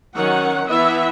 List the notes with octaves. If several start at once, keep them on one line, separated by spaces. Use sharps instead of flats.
D#3 F#3 C#4 F#5
E3 B3 E4 E5